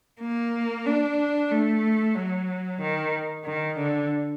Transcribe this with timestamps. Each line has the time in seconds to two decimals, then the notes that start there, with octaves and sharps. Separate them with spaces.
0.21 A#3
0.86 D4
1.51 A3
2.15 F#3
2.81 D#3
3.45 D#3
3.78 D3